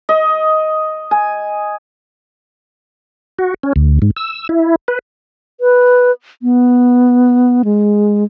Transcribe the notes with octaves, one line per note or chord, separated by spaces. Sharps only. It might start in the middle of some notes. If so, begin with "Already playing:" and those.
D#5
G#5
F#4
C#4
D2
G#2
E6
E4
B4
B4
B3
G#3